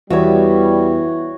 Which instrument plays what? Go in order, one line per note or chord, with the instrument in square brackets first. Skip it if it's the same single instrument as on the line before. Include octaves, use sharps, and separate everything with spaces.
[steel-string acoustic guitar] E2 B3 E5 [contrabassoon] E3 [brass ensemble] G3 [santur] F#4 C#5